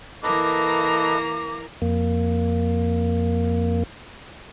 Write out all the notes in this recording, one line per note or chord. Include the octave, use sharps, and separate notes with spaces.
E3 A#3 A4 B4 D#5 A#5 D6
F2 A#3